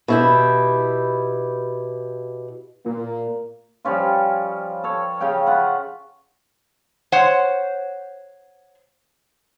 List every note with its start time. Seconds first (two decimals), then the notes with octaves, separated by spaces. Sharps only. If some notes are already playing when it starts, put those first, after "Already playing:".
0.08 B2 E4 G4
2.86 A#2 A#3
3.85 F3 G3 C#4 F4
4.84 A4 C#5
5.20 C#3 C#4 F5 G5
5.46 F4 F#5 B5
7.12 C5 C#5 F#5